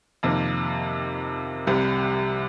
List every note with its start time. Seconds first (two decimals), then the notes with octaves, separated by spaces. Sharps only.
0.23 F2 C3 D#3 A#3
1.67 C2 C3 G3